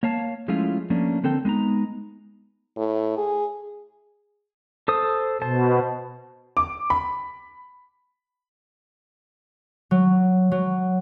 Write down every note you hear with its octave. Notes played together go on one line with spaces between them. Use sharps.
A#3 C#5 F5 A5
F3 G#3 A3 C#4 E4 F4
F3 A3 A#3 C#4 D4
D3 C4 A4 A#4 G5
G#3 B3 D#4 A#5
A2
G#4
A4 C5 D#6
B2 C5 A5
D6
B5
F#3
F#3